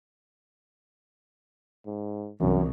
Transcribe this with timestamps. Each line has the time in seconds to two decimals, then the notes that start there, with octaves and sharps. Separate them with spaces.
1.86 G#2
2.40 C2 F#2 E3